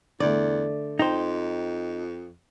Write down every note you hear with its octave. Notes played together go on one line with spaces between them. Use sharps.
E2 D3 A3 D5
F2 D#4 C5 G5